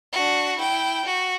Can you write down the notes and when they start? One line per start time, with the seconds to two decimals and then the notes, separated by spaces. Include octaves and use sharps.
0.13 D4 F#4
0.58 E4 G5
1.06 F#4